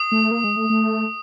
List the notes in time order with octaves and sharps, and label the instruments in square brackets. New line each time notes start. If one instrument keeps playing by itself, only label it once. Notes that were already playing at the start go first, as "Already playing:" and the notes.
Already playing: [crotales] D#6
[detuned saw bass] A3
A#3
G#3
A3
A3